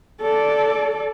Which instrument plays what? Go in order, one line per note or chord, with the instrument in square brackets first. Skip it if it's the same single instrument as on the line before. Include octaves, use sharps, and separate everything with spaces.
[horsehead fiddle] A4 D5